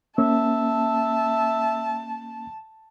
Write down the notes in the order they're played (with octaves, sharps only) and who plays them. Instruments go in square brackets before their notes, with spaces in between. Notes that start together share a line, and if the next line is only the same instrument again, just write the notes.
[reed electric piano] A#3 C#4 [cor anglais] E5 [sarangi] A5